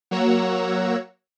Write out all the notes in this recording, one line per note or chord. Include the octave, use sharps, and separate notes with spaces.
F#3 A#3 C#5 F#5 A#5 E6